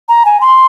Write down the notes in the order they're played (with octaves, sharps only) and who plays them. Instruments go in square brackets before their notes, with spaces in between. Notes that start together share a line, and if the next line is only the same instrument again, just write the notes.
[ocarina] A#5
G#5
C6